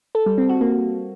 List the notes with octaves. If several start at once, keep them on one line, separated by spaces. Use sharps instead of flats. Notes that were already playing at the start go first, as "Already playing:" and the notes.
A4
G3
C4
F#4
A#3